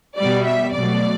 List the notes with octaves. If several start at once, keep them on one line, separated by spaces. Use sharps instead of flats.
B2 G3 D5
E5
B2 F#3 A3 D5